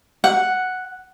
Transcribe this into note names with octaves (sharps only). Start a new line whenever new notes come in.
F#5